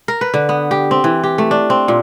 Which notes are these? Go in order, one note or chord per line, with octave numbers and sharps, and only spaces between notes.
A#4
B4
D3
B3
G4
C4
E3
G4
A3
D4
C4
A#2